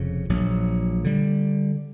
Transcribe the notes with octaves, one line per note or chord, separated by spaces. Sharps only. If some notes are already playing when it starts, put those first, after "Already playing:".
Already playing: F1 F2 C#3
A#1 A#2 F#3
D3 G3